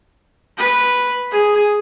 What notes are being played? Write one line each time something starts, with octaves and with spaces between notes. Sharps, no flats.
B4
G#4